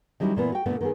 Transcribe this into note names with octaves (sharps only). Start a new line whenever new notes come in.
D#3 F#3 G3 C#4 E4
A#2 E3 B3
F#4 G5
A#2 D3 A3 B3
D#3 B3 G#4